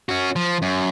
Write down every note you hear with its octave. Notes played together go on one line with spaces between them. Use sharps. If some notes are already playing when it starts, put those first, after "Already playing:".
C#4 F#4
F3
F#2